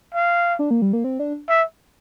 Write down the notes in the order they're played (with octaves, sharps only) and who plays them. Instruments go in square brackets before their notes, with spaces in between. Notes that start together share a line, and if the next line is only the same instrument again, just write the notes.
[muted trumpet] F5
[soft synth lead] D4
A#3
G3
A#3
C4
D4
[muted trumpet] E5